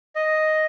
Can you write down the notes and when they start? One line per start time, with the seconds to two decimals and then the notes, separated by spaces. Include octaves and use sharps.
0.16 D#5